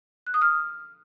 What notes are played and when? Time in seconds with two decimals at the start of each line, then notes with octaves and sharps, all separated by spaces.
0.27 F#6
0.34 D#6
0.42 F6